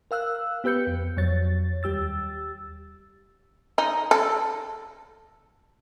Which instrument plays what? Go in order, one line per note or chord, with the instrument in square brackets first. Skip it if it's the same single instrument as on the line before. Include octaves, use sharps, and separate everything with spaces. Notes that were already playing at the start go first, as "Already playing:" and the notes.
[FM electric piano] A#4 F5 E6 F#6
B3 G4 B4 G6 C#7
F2
F2 F#3 C#5 A6
D#2 G3 G4 E6 A6
[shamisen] D#4
A4